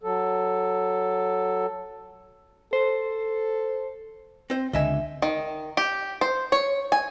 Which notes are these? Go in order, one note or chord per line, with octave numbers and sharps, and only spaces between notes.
F#3 A4
A4 C5
C4 C5
C#2 D3 D#5 E5 G#5
D#3
G4
C5
C#5
G#5